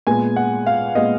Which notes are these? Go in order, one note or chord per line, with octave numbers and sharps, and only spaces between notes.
A#2 G#3 B3 G#5
F#5
F5
A#2 G#3 B3 D#5